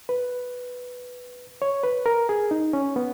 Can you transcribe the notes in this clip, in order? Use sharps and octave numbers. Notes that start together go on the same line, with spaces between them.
B4
C#5
B4
A#4
G#4
D#4
C#4
B3